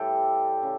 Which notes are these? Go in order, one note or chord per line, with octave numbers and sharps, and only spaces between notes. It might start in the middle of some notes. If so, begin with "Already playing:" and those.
Already playing: A2 E3 G3 G4 A4
C#3